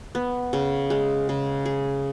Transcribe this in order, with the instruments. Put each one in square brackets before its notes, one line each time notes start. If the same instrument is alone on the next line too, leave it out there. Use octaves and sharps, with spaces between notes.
[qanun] B3
C#3
G#3
C#3
G#4